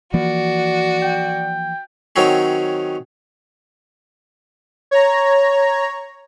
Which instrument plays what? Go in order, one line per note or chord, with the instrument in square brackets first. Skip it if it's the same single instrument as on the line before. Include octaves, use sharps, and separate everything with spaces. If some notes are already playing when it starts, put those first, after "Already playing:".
[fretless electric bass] E3 F3 A#3 [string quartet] F#4 [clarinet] D5
[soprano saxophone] G5
[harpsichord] D#3 F#3 C4 C#4
[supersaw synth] C#5 A#5